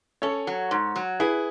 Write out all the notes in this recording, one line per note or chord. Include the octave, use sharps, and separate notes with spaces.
C#4 A4 C#5
F#3
G#2
F#3
E4 G#4 B4